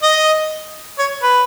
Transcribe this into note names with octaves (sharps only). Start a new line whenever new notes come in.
D#5
C#5
B4